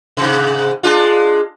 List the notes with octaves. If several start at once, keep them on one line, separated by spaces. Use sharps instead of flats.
G#2 C3
G#3 D4 F4